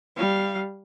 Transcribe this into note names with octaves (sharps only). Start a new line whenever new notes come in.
G3 F5